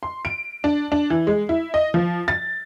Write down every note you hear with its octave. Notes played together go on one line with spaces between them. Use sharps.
C6
D7
D4
D4
E3
G#3
E4
D#5
F3
A6